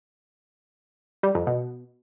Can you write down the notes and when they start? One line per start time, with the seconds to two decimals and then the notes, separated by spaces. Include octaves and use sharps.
1.23 G3
1.35 F2
1.47 B2